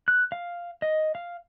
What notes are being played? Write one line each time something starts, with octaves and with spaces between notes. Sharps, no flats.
F#6
F5
D#5
F5